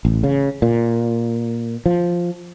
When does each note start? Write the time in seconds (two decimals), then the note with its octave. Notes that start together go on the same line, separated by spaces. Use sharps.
0.05 A1
0.24 C#3
0.62 A#2
1.86 F3